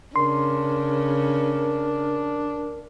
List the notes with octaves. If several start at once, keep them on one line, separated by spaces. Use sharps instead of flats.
C#3 D4 A#4 C6